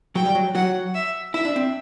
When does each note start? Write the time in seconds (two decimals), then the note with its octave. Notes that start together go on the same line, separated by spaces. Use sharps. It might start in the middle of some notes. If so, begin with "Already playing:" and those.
0.15 F#3 F#4 G5
0.25 G3 G4
0.35 F#3 F#4
0.55 F#3 F#4 F#5
0.94 E5
1.34 E4 E5
1.45 D4
1.56 C4